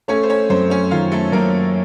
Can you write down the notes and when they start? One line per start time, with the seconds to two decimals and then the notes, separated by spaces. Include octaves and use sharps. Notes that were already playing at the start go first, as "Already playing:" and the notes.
0.08 A3 C#4 C#5
0.23 C5
0.29 C#4 C#5
0.50 F#2 C4 C5
0.70 C#4 C#5
0.91 D#3 F4 F5
1.12 A3 A4
1.32 F#2 A#3 A#4